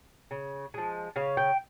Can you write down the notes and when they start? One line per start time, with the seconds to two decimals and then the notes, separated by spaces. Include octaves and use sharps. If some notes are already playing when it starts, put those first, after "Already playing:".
0.31 C#3
0.74 F3 G#3
1.16 C#3 F5
1.37 G5